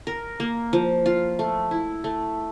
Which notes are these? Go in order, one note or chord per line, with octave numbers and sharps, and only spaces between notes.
A#4
A#3
F3
F4
A3
E4
A3